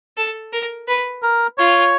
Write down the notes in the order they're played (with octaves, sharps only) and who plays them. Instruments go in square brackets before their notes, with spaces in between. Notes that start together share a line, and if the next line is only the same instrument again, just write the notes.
[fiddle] A4
A#4
B4
[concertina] A#4
[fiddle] F4 [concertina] C#5